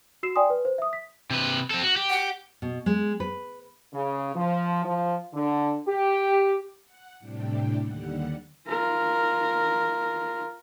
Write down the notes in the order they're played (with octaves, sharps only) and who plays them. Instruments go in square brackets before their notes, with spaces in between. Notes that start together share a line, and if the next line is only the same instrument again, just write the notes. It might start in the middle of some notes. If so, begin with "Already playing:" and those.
[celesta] F#4 E6 C7 E7
D5 G5 G#5 C6 D#6
B4
C5
E5 D#6
B6
[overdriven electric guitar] C3 B4
C4 A4
F#4
G4
[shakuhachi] F#5
[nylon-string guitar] B2
G#3
B4
[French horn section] C#3
F3
F3
D3
G4
[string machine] F#5
A2 C3 G3 D4 G4
D#2 D3 G3 F#5
[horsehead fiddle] F4 A#4